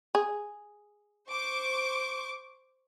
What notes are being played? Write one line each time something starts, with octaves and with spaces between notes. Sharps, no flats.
G#4
C5 C#6 D6